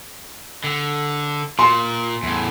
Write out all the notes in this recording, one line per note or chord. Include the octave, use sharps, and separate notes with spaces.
D3
A#2 C6
E2 A2